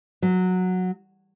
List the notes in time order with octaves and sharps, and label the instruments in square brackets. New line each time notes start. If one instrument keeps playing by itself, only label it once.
[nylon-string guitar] F#3